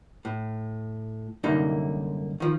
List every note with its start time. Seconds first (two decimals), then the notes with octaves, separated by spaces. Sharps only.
0.25 A2
1.44 C2 F#2 D3 A#3 D#4 E4
2.40 D#3 F3